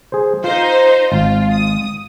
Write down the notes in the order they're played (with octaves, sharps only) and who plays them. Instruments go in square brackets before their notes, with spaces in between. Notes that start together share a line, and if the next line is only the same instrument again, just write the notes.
[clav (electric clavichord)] G#4 C5
[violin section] D#4 C5 [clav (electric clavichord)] F4
[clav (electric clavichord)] G#1 [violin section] F4
[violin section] D#6